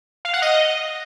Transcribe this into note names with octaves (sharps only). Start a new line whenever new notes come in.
F5
F#5
D#5